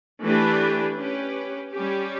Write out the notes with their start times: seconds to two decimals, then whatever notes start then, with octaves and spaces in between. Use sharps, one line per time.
0.21 E3 A3 D4 G4 B4
0.97 C#4 G4 B4
1.73 G3 C#4 G4